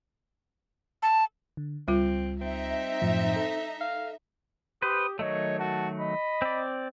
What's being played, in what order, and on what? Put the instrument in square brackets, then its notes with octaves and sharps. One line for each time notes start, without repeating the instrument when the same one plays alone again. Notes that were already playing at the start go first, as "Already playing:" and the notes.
[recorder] A5
[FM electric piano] D3
[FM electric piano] C#2 [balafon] G3 F4 [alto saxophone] C4
[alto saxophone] C4 [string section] D#4 E5
[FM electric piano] F#2 A2 F3
A4
[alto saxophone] F5
[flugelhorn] G4 [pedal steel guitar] B4 C5 [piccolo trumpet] D#6
[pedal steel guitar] D#3 F#3 A3 [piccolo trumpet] C#5 [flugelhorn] D#5
[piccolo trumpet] F#4 [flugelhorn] A5
[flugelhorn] D#5 [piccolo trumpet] B5
[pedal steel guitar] C4 D5